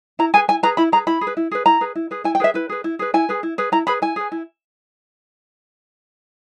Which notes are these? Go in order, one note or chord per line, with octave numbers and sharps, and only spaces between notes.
E4 A#5
G#4 B4 G#5
E4 G#5
G#4 B4 A#5
E4 B5
G#4 B4 A#5
E4 B5
G#4
B4
E4
G#4 B4
E4 A#5
G#4 B4
E4
G#4 B4
E4 G#5
G5
G#4 B4 E5
E4 B4
G#4 B4
E4
G#4 B4
E4 G#5
G#4 B4
E4
G#4 B4
E4 A#5
G#4 B4 B5
E4 G#5
G#4 B4
E4